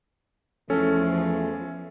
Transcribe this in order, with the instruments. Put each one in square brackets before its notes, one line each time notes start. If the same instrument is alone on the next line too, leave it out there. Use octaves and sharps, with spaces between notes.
[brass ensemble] E2 E3 A3 [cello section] F3 [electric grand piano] C#4 A4